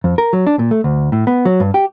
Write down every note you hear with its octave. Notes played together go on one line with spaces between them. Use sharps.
F2
A#4
F#3
D4
A#2
A3
D2
A2
B3
F#3
G2
G4